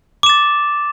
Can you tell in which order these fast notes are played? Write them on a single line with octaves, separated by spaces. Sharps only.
D6 E7 A6